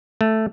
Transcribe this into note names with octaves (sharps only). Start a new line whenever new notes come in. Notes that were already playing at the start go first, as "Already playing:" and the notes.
A3